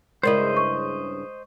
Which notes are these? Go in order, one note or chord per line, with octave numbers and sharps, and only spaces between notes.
G2 C#3 G#3 E4 A#4 C5 D5 D#5
C#6